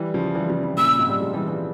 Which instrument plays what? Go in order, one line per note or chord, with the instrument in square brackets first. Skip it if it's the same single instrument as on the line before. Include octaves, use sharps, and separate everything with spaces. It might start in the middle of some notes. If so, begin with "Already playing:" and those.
Already playing: [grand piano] E3 G3
C#3 F3
E3 G3
C#3 F3
C3 E3
[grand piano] A#2 C#3 [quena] E6
[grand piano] G#2 C3
G3
F3 G#3
E3 G3
E3 G3